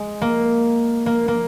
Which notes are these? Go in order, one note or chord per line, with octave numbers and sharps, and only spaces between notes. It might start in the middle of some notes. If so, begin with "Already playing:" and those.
Already playing: G#3
A#3
A#3
A#3